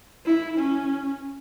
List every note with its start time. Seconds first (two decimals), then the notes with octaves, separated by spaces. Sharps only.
0.25 E4
0.58 C#4